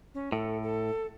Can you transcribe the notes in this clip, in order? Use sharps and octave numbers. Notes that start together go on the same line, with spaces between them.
C#4
A2 A4
A4